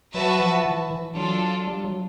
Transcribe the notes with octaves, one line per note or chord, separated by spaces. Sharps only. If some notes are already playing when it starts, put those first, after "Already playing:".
F#3 F#4 B4 E5 A5
F3
E3
E3
F#3 D4 F4 A4
G3
F#3